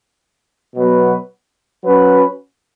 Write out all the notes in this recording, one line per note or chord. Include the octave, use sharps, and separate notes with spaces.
B2 F#3 B3 F#4 B4
F#3 C#4 F#4 B4